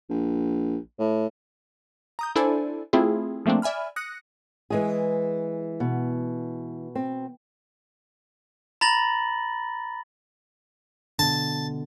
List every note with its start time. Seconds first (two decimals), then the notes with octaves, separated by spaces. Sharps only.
0.10 A#1
0.99 A2
2.19 A#5 D#6 G6
2.35 D4 E4 A4 C5 D5 G#5
2.93 A3 C4 E4 F4 G#4
3.46 F3 A3 A#3 C4 D4
3.62 D5 E5 G#5 B5 F6
3.96 D#6 F#6 A#6 C#7
4.70 E3 G#3 G#4
5.80 B2
6.95 C4
8.81 A#5 B5 A6 A#6 F#7
11.19 B2 D3 A5